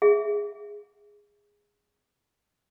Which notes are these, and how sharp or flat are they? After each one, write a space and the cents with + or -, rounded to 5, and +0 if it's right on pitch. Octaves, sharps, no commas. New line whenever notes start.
G#4 -15 E5 +0